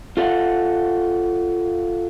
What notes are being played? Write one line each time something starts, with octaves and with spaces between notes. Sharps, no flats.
F4 A4 F5 F#5